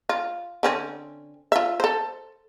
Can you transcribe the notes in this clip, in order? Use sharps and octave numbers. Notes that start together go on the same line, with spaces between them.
F4
D3 C4 C#4
F4 E5
A4 C5